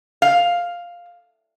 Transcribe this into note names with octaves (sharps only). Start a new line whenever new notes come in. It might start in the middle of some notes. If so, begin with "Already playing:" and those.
F5